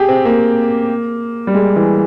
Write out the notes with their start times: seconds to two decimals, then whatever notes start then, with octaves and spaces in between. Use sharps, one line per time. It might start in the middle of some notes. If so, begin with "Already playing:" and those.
Already playing: G4 G#4
0.09 C4
0.25 A#3
1.47 G3
1.54 G#3
1.76 E3